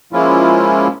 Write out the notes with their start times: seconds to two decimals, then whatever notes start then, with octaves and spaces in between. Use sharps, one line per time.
0.13 F3 G#3 A#3 C#4 E4 F4